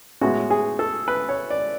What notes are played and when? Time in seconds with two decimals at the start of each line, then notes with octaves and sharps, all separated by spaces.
0.21 A2 G#3 B3 F#4
0.50 G#4
0.79 A4
1.08 B4
1.29 C#5
1.51 D5